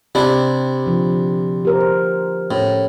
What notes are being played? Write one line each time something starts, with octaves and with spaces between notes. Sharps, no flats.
C3 D4 E4 G4
D3 F3
G4 A#4 C5
A2 C#4